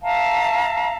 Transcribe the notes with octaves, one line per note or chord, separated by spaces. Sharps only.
E5 F5 A5 A#5